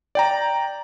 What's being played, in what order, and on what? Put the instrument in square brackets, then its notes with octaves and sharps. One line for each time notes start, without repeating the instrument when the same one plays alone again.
[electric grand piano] D5 G5 A#5